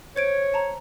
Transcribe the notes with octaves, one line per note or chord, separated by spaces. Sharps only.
C5 C#5 G#6 D7
A5 A#5